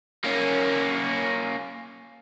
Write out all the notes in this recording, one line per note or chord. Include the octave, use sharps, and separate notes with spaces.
A#3 C#4